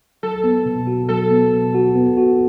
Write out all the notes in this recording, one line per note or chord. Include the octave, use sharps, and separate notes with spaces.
F#3 A4
B3
B2
F#4
F#3 A4
B3
B2
F#4
B3
F#4